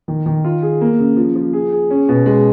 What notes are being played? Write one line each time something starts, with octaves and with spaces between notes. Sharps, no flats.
D#3
D#3
F4
G#4
A#3
C#3
F3
F3
G#4
G#4
C#4
B2
G#3